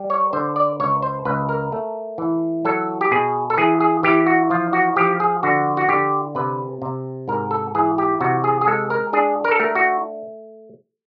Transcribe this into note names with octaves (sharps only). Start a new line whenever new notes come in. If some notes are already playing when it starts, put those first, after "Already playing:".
Already playing: G3
C#5
D3 C5
D5
C#2 C#5
C5
C#2 B4
A#4
A3
E3
F#3 A4
G4
B2 G#4
A4
E3 G#4
G#4
E3 G4
F#4
F3 F4
F#4
F3 G4
G#4
D3 F#4
F#4
D3 G4
C3 B4
C3
G#2 A#4
A4
E3 G#4
G4
C3 F#4
G#4
G#4
G#3 A4
A#4
D4 G#4
A#4
A4
A3 A#4
F#4